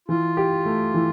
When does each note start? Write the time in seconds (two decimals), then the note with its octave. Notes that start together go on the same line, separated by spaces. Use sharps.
0.08 E3 F4
0.37 G4
0.65 A3
0.94 E3